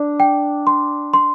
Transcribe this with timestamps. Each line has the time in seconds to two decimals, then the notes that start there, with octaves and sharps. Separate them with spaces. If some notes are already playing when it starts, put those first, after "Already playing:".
Already playing: D4 D5
0.20 G5
0.67 C6
1.14 C6